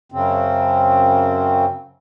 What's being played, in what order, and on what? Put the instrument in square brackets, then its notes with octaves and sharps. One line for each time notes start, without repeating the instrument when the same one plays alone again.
[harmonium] F#2 C#3 C4